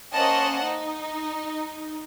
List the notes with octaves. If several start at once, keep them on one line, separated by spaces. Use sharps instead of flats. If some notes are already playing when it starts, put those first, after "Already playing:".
A#3 C#4 C5 D#5 F#5 A5
D#4